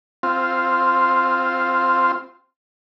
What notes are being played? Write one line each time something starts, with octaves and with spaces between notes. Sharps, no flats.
C4 F4